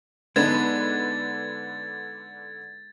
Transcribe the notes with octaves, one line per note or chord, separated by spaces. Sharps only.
D3 G#3 B3 D4 D#4 B4 G#6 A6